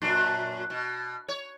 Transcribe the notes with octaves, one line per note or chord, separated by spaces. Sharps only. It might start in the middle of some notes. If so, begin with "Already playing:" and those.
F#2 A#2 D4
B2
C#5